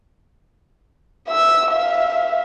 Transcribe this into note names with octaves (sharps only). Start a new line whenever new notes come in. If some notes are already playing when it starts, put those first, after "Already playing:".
E5 E6
E5 F5